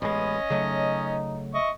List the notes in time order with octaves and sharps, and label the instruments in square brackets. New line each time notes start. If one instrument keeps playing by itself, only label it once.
[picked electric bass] A1 G#3 [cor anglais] B3 [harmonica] C#4 D#5
[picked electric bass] C#3 F#3 A3 [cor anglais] D#4
[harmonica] D#5 C#6 [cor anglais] E5